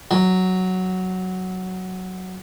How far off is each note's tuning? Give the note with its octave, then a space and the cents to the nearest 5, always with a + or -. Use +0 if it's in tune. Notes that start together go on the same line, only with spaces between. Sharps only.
F#3 +5